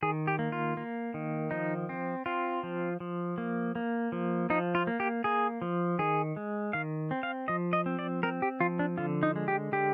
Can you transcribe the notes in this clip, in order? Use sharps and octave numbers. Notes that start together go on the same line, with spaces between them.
D#3 G#4
G4
A#3
F4
A#3
D#3
F3 D#4
C4
C4 F4
F3
F3
A#3
A#3
F3
F3 D#4
F4
A#3
G4
A#3 G#4
F3
D#3 G#4
G#3
D#3 F5
C4
F5
F3 D#5
D#5
C4
D5
C4 A#4
G4
F3 F4
D4
D3 F4
D#4
G#3
G4
D3 G4